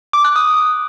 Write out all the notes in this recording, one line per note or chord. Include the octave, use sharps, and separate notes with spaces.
D6
F#6
D#6